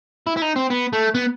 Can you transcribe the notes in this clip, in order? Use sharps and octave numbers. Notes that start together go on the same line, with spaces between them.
E4
E4
D#4
C4
B3
A3
B3